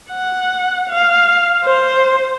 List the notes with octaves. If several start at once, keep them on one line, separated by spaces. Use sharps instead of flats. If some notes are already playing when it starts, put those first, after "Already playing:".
F#5
F5
C5